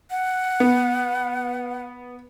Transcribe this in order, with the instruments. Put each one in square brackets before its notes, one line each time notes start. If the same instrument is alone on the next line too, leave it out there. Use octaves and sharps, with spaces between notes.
[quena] F#5
[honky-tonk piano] B3